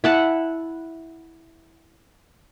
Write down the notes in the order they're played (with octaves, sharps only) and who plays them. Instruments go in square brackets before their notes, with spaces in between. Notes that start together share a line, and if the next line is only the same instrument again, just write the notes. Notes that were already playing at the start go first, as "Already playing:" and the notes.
[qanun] E4 F#5 A5